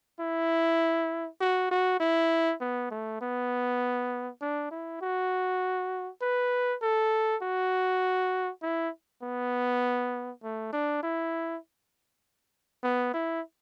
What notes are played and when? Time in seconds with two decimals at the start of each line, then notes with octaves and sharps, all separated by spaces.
0.20 E4
1.40 F#4
1.71 F#4
2.00 E4
2.61 B3
2.91 A3
3.21 B3
4.41 D4
4.71 E4
5.01 F#4
6.22 B4
6.82 A4
7.42 F#4
8.62 E4
9.23 B3
10.43 A3
10.72 D4
11.03 E4
12.83 B3
13.14 E4